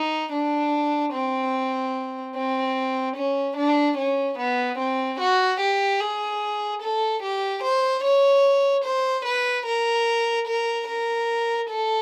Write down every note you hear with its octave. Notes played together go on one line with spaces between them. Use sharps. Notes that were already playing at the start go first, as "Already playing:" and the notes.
Already playing: D#4
D4
C4
C4
C#4
D4
C#4
B3
C4
F#4
G4
G#4
A4
G4
C5
C#5
C5
B4
A#4
A#4
A#4
A4